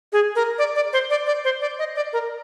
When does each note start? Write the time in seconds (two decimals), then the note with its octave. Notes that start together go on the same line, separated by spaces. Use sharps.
0.13 G#4
0.36 A#4
0.59 D5
0.75 D5
0.93 C5
1.10 D5
1.26 D5
1.44 C5
1.61 D5
1.79 D#5
1.96 D5
2.13 A#4